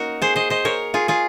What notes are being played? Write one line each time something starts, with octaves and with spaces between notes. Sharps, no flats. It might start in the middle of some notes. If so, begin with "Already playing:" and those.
Already playing: A#3 C#4 D#4 F#4 A#4
G#4 C5
C5 D#5
C5 D#5
A#4 C#5
F4 G#4
F4 G#4